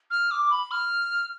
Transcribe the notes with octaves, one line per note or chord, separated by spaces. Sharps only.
F6
D6
B5
F6